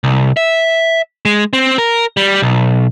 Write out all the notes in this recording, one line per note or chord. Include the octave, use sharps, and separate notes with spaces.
C2
E5
G#3
C4
A#4
G3
B1